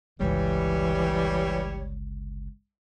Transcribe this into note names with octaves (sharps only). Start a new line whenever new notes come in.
G1 C#2 E3 G3 C#5